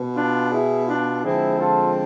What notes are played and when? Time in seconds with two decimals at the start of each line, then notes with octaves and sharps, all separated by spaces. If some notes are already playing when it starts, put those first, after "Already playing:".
Already playing: B2 B3
0.16 D4 F4
0.51 E4 G#4
0.87 D4 F4
1.22 D3 F3 G#3 C4 E4 G#4
1.58 F4 A4